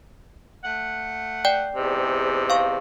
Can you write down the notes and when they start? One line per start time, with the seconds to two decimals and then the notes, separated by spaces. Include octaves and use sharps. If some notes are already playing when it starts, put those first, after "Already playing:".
0.63 A3 F#5
1.45 D5 G5
1.75 E2 G#2 C3
2.50 F5 C#6